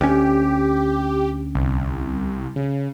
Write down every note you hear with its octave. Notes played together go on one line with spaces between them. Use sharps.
D2 C#4 G4
C2
C#3